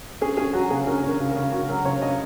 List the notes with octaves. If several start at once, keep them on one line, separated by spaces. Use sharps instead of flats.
C#4 G#4
C#4 G#4
F#3 F#4
C#3 G#4
C#4 A#4
C#4
A#4
C#3
A#4
C#3
C#3 F#4
F#3 A#4
C#3 C#5
C#3 D#5